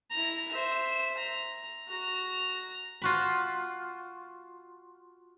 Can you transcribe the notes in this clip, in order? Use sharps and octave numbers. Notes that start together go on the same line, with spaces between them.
E4 A#5
C5 E5
A#5
F#4 A#5
F4 F#4 B5